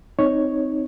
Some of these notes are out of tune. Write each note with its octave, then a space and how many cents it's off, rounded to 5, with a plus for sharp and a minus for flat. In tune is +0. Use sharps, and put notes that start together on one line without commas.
C4 -5 D#4 +0 C#5 +0